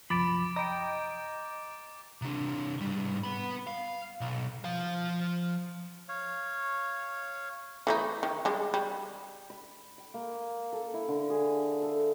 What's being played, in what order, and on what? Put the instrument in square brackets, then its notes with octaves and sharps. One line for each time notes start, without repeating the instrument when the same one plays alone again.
[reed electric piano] C2 F#2 F3 [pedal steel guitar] B5 [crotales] D6 A6 D7
[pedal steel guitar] D#5 G5 [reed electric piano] A#5
[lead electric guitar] C3 D4
G#2 G3
B3 B5
F5
B1
F3 F5
[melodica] C#5 F5
[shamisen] E3 A3 D#4
D#3
G3 G#3
G3
[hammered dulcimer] B5
G5
A#3
A4
E4
D3
G#4
A4